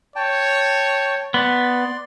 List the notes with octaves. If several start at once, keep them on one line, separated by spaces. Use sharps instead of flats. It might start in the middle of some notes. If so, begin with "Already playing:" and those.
C#5 G5 A5
B3 D5 C6